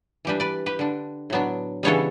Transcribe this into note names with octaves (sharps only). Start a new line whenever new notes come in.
E3 G3 D4 G4 B4
B4 D5
G4 B4
D3 G3 D4
A2 F#3 B3 D4
C#3 E3 G3 B3 D4 A4 C#5